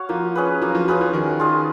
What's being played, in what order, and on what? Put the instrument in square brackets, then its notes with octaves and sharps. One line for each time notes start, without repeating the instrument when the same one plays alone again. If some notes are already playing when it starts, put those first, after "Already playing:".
Already playing: [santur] F#4 C#5 F5
[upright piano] F3 [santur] A#3
[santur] C#4 G#4 B4
[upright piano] F3 [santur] A#3
[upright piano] F#3
F3
[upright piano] F3 [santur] C#4 G#4 B4
[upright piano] F3
[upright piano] D#3 [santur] C#4
[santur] F4 G#4 D#5